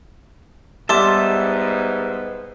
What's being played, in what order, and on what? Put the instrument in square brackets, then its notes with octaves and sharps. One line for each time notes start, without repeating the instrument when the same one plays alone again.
[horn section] G#2 B3 [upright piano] G3 [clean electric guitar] E5 A5 [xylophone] C6 D6 E7